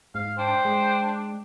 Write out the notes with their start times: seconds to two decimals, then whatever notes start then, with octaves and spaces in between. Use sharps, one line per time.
0.15 G#2 F5
0.38 D4 C5 G5
0.65 G#3